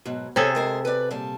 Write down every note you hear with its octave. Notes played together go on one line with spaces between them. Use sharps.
G#2 B2 F#3
C3 G#4 A4 C#5
G#3 A#4 C5
B4 D5
A#2 G3 A5